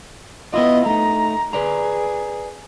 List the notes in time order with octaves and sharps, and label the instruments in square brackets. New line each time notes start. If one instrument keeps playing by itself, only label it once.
[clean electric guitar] B3 E4 F4 [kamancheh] D#5
[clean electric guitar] A3 D#4 [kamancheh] A#5
[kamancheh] G#4 [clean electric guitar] B4 D5 A#5